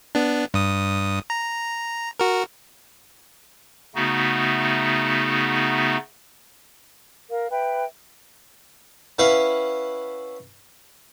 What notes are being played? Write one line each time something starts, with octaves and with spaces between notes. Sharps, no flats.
B3 D4
G2 D#6
A#5
F#4 A#4
C#3 A3 B3 D#4 F#4
A#4 F5
B4 E5 G5
C#4 E4 B4 F5 F#5